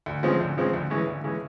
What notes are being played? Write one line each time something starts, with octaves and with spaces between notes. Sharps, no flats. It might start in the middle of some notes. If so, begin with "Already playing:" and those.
D2
C#3 F3 G#3 C4
D2
C#3 F3 G#3 C4
D2
C#3 E3 G#3 C#4
D2
C#3 E3 G#3 C#4